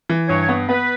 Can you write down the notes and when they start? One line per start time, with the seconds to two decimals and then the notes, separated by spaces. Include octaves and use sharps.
0.09 E3
0.29 G2 C#5
0.49 B3
0.69 B3 B4